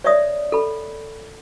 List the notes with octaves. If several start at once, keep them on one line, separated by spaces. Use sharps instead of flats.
C#5 D5 E5 D#6
A4 B5